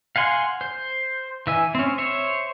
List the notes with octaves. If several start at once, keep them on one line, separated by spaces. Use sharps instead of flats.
F5 F#5 G#5 C6
C5
E3 E5 G#5
C4 C#4
C5 C#5 E5